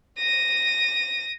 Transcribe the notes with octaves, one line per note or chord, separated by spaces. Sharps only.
A#6 D#7